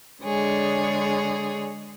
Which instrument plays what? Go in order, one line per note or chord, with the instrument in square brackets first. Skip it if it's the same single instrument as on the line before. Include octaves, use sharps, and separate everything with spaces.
[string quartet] D3 G#3 G#4 C#5